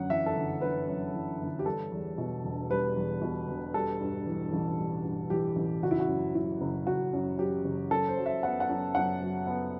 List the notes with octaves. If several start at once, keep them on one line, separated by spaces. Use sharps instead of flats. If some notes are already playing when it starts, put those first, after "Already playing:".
Already playing: G1 F#2 F#5
E3 E5
A4
G1
G1 B4
F#2
E3
G1
G4
G3 A4
E2
B2
E1
G3 B4
E2
B2
E1
G3 A4
G2
E3
A1
G3
G2
E3 G4
A1
F#1 F#4
E4
F#4
F#2
F#3 E4
F#1
F#1 F#4
F#2
F#3 G4
F#1
F#2 A4
C5
F#3
E5
B3 F#5
F#5
F#2
F#2 F#5
F#3
B3